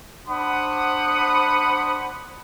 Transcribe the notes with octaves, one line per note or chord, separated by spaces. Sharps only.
D4 C5 F#5 B5 D#6